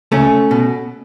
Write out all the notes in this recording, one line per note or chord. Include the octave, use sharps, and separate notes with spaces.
C#2 A3 C#4
B2